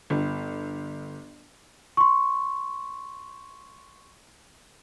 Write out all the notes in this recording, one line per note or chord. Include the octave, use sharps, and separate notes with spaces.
G1
C6 C#6